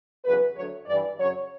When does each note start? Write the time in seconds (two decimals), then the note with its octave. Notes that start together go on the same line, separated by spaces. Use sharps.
0.25 E2 C#3 F#3 B4
0.56 D2 D3 F#3 C#5
0.86 G2 E3 D5
1.18 F#2 C#3 F#3 C#5